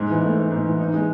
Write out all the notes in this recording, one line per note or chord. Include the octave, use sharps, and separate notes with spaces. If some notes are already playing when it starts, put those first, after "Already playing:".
Already playing: G#2 G#3
E3
A3
G#2
G#2
E3
D#4
G#3